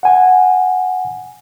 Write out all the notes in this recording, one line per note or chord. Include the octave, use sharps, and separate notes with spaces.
F#5 G#5